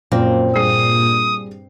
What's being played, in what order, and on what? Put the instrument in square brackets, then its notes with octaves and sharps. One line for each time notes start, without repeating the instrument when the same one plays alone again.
[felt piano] F#2 [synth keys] A#2 [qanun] C4
[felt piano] G2 G#4 C7 [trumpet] D#6